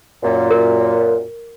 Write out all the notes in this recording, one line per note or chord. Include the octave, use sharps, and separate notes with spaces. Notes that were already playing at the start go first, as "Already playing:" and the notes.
F#2 A#2
A#4